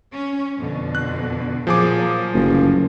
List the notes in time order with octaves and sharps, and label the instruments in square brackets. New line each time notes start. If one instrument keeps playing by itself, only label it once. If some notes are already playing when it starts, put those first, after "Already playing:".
[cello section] C#4
F2 B2 D3
[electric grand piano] F#6
[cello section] A#2 F#3 [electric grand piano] F3 G#4 D6
[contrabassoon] F#1 [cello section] D2 G2